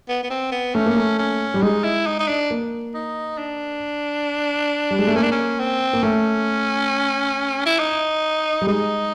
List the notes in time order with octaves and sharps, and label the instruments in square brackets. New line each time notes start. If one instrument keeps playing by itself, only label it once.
[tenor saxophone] B3
B3
C4
B3
[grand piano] A3 [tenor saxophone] C#4
[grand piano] A#3
A3
[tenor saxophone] C#4
[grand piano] G3
[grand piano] G#3 [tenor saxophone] D#4
[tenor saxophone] E4
D#4
D#4
D4
[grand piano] A#3
[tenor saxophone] D#4
D4
[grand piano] G3
G#3
A3
[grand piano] A#3 [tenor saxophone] C#4
[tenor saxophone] D4
C#4
C4
[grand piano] A#3
[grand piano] A3 [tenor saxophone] C#4
[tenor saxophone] E4
D#4
[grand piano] G3
[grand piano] G#3 [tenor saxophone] D#4